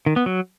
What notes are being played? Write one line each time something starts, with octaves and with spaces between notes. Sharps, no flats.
D#3
B3
F#3